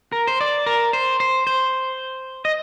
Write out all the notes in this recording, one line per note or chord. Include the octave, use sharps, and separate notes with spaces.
A#4
C5
D5
A#4
C5
C5
C5
D#5